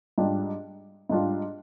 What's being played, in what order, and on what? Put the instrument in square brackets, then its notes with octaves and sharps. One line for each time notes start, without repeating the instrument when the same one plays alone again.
[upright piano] G#2 G3 D4 F4
G#2 G3 D4 F4